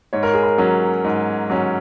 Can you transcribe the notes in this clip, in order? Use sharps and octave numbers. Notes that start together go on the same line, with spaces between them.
G#2 C#5
A#4
G#4
A#4
F#3 C#4
G#2
F#3 C#4